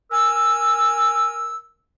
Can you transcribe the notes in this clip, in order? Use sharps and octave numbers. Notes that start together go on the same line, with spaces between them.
A#4 G#5 E6